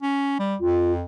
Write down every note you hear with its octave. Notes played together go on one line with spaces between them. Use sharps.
C#4
G3
F2 F4